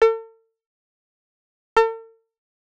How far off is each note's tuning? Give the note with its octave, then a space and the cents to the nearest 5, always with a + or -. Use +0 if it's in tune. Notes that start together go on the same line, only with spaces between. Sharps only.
A4 +40
A4 +45